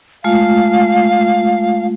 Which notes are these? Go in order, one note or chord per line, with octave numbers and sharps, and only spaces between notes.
G#3 A3 F4 F5